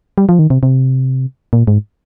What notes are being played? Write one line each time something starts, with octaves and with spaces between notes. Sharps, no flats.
G3
F3
D#3
C3
C3
A#2
G#2